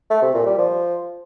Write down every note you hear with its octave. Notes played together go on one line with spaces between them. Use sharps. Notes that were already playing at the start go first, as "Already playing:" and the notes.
A3
C3
A#2
G3
F3